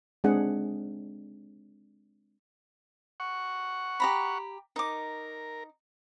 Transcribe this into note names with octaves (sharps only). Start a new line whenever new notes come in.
G#3 C4 D4 G#4 F#5
F#5 C#6
G4 A#5 B5
D#4 A#4 D6